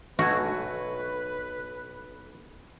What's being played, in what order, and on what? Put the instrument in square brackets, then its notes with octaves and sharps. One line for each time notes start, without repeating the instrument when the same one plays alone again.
[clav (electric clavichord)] B1 A3 G#5 [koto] F#4 [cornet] B4